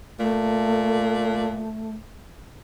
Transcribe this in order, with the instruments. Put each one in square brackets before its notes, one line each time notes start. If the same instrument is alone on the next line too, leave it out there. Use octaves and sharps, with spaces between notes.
[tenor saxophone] A#2 [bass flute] A3